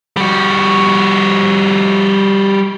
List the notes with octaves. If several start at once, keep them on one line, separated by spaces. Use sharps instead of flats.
G3 F#4